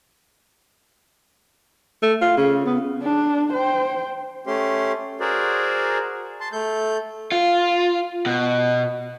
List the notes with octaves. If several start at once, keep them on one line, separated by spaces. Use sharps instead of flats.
A3
F4
C#3
B3
D4
C5 G5
A3 C#4 G4 C6
F#4 G#4 A#4 C5 D5
A5 C6
A3 A4 G6
F4
B2